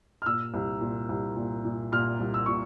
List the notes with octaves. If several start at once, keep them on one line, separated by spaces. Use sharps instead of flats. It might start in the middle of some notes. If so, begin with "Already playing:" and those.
F6
A#2 E6
C2
A#2
C2
A#2
A#2
A#2 F6
C2
E6
A#2 C#6